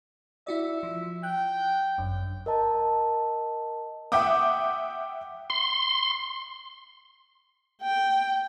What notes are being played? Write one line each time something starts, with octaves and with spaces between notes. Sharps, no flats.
E4 F#4 D5 E5
F3
G5 F#6
G1 F#2
A#4 D#5 A5 A#5
E5 F#5 G5 D6 D#6
C6
G5